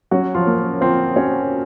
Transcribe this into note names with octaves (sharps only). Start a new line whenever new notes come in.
F#3 C#4 F#4
F3 F4
A#3
F3 C4 C5
C#4 F#4 C#5